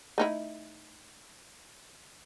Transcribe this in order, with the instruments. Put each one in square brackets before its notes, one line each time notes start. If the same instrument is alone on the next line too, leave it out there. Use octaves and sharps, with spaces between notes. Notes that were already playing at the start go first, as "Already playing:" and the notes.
[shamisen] A3 D#4 E4